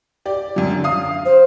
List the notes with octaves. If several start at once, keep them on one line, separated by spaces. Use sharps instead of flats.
G4 D5
F#2 F#3
D3
F5 D#6
C5